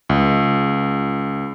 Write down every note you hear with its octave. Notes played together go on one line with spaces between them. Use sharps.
C#2